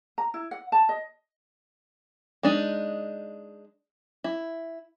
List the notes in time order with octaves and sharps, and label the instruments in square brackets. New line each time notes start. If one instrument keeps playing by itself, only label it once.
[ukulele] A#5
E4
F#5
A5
D#5
[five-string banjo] G#3 D4 D#4
E4